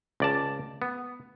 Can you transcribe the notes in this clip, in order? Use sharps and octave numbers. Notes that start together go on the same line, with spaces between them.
C#2 D5 A5
B3